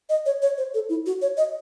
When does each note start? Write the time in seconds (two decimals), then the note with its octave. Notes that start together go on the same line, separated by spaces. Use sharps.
0.09 D#5
0.26 C#5
0.42 C#5
0.58 C5
0.74 A4
0.89 E4
1.06 F#4
1.22 C#5
1.37 D#5